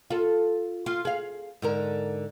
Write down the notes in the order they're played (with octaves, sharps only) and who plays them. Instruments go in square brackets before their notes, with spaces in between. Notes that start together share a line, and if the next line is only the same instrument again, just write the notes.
[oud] F4 A4
F4
G#4 F5
G#2 D3 A#4